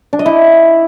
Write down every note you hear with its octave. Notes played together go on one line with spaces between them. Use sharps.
D4
D#5
E4